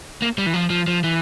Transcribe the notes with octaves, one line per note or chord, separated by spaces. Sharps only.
A#3
G3
E3
F3
F3
F3
E3